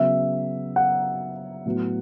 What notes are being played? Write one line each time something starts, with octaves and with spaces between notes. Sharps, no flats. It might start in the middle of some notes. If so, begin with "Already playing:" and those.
Already playing: C#3 F#3 B3 E5
F#5
A2 F#3 B3